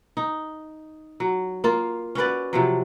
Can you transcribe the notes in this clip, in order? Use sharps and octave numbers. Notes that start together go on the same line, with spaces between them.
D#4
F#3
A#3 F4
C#4 F#4 B4 D5
C3 F3 F#3